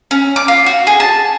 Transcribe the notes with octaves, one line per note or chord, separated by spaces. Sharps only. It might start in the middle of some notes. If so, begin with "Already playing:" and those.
C#4
D6
F4
F#4
G#4
A5